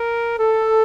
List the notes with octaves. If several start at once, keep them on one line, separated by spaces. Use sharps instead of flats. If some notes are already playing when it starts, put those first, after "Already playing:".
Already playing: A#4
A4